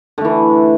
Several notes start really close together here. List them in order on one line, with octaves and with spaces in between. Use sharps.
D3 A3 E3